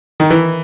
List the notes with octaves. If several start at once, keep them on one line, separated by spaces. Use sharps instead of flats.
D#3
E3